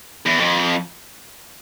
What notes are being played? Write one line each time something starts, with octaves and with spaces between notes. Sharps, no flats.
E2
F2